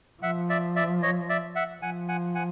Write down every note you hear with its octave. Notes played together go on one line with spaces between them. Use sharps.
F3 E5 F#5
D5 E5
D5 E5
C#5 D#5
D5 E5
E5 F#5
F3 F#5 G#5
F#5 G#5
F#5 G#5